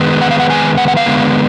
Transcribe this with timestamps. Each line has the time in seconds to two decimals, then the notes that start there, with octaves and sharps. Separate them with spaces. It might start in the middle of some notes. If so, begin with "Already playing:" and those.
Already playing: D#3 G#3 B3
0.21 F#5
0.31 F5
0.40 F#5
0.50 G#5
0.77 F#5
0.88 F#5
0.97 F5
1.06 D3 G#3 B3